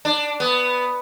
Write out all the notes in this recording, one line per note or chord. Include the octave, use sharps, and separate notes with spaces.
D4
B3